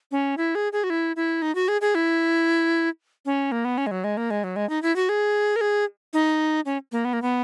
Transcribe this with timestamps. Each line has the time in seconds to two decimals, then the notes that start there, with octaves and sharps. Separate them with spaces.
0.12 C#4
0.37 E4
0.55 G#4
0.73 G#4
0.84 F#4
0.90 E4
1.16 E4
1.42 D#4
1.55 F#4
1.68 G#4
1.81 G#4
1.95 E4
3.26 C#4
3.52 A#3
3.65 B3
3.78 C#4
3.87 G#3
3.91 F#3
4.04 G#3
4.17 A#3
4.31 G#3
4.44 F#3
4.56 G#3
4.69 D#4
4.82 E4
4.96 F#4
5.09 G#4
5.56 A#4
5.61 G#4
6.13 D#4
6.66 C#4
6.92 A#3
7.05 B3
7.13 A#3
7.22 B3